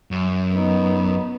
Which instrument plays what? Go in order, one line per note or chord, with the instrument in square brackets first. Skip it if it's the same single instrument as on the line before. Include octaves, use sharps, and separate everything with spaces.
[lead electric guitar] F#2
[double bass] B3 D#4